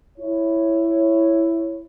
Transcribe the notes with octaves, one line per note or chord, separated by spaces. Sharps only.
E4 C#5